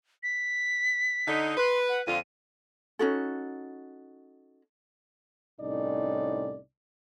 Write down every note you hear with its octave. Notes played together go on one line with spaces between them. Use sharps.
B6
D3 D#4
B4 C6
F#5
F2 D3 F4 D#7
C#4 D#4 F#4 A4
C2 A2 C#4 D#4 D5